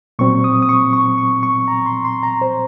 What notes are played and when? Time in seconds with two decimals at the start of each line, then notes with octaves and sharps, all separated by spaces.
0.19 A#2 F#3 C4 C#6
0.44 D#6
0.62 D#6
0.69 C#6
0.93 C#6
1.18 C#6
1.43 C#6
1.68 A#5
1.86 C6
2.05 C6
2.23 A#5
2.41 C5